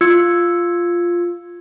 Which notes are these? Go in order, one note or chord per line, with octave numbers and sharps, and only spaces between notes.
F4 E6 G#6 C#7